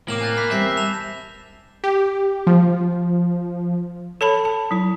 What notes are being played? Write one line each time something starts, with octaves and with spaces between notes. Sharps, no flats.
A2 C3 A#3 D6 E7 F#7
G#5 F#6 A6
B5 F#6 B6
E2 G3 C4 E5 G6 A#6 C7
A5 E7 F7
G4
F3
A4 C#5 A5 B5
A5
F#3 E4